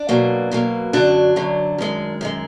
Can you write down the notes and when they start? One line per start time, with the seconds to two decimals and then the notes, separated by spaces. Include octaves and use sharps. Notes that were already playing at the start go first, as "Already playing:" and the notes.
Already playing: D4
0.09 B2 F#3 A#3
0.51 B2 F#3 A#3
0.93 F#2 D3 F#3 D4
1.36 F#2 D3 F#3
1.78 F#2 D#3 G#3
2.21 F#2 D#3 G#3